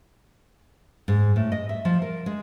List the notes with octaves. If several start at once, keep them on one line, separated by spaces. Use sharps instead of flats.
G#2
A2
D#5
E5
F3
A#4
G#3